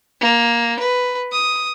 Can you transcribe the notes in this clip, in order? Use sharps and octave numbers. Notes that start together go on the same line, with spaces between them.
A#3
B4
D#6